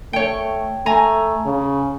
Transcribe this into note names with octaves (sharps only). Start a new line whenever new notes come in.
A3 C#5 G5
A3 G#5 A#5
C#3